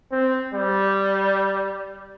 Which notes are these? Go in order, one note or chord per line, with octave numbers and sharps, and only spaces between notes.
C4
G3